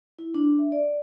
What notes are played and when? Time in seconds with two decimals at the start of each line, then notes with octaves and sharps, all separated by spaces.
0.19 E4
0.34 D4
0.59 E5
0.72 D5